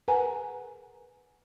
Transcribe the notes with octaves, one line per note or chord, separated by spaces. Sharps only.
G#4 A#4 B4 F#5 G#5 A#5